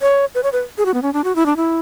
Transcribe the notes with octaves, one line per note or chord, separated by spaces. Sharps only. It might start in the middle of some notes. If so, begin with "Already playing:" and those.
C#5
B4
C#5
B4
G#4
F#4
B3
C#4
D4
F#4
E4
D4
E4